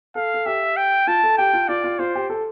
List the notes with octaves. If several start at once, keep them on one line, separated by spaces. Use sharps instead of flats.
A4 F5
A4
G4 E5
G5
F4 A5
A4
G4 G5
F4
F4 D5
F4
F4 C5
G4
A4